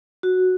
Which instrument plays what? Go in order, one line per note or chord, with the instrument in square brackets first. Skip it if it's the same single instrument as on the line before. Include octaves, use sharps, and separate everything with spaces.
[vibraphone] F#4